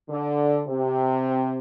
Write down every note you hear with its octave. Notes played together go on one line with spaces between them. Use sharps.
D3
C3